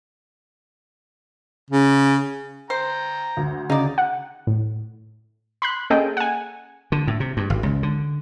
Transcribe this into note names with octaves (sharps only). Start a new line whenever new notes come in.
C#3
C5 G5 A#5
D2
C#3 D#4 D5
F#5
A2
B5 C6 F#6
A#3 C#4 G#4 A4 D#5 G5
F#5 G#5
D3
A2
C3
G2
G#1
C#2
D3